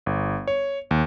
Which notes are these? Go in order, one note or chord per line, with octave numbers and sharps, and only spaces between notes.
G1
C#5
D#2